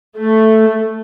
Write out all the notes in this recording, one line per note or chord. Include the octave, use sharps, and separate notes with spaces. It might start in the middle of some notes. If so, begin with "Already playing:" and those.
A3